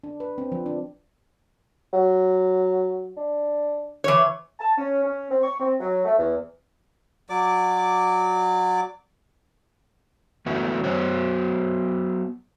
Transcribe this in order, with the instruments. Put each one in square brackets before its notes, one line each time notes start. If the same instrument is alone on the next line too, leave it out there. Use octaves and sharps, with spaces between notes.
[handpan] D4
B4
C4
F3
D4
[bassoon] F#3
D4
[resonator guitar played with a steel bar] E3 C#5
[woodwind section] A5
C#4
C#4
C4
C#6
C4
F#3
A3
E2
[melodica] F#3 D5 D6
[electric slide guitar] E3 A3 B3 F#4 B4
F#3 B3 F#4 C5 C#5